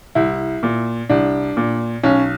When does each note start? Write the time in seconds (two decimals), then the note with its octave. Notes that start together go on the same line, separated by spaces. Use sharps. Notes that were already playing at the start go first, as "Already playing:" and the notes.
0.15 C2 E4
0.63 A#2
1.09 C2 D4
1.57 A#2
2.04 B1 C#4